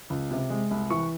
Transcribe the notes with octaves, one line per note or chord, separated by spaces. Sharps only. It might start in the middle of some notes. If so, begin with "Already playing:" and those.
C#2
C3
G#3
C2
E3 C#6